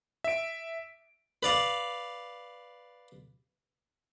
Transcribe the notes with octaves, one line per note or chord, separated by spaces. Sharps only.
E5 D7
B4 D5 F5